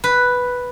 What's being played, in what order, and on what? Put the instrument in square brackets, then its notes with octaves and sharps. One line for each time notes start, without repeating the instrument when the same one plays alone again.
[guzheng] B4